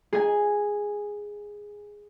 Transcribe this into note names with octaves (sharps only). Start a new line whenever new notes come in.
G#4 G#5